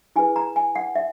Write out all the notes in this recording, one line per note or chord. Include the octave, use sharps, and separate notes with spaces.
E4 G#4 B4 G#5
A#5
G#5
F#5
E5